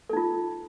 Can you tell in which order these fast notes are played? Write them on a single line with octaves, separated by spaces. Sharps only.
A4 D#4 F4